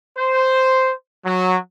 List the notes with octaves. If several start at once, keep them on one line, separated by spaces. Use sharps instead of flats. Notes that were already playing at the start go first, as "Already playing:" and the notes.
C5
F#3